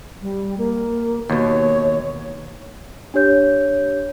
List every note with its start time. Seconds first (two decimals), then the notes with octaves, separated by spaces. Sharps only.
0.22 G3
0.58 A#3
1.30 D#2 B2 C#5
3.14 D4 G4 C#5 G6